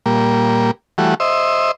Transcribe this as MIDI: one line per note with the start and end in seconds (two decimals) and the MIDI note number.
0.06 0.71 46
0.06 0.71 55
0.06 0.71 58
0.98 1.14 52
0.98 1.14 55
0.98 1.14 57
0.98 1.14 66
1.20 1.71 72
1.20 1.71 75
1.20 1.71 76